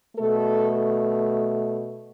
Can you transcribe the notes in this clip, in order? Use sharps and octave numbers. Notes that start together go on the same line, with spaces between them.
B2 A3 A4